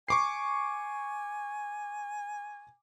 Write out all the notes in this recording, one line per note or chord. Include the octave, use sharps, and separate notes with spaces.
G#5 C#6 D6 C7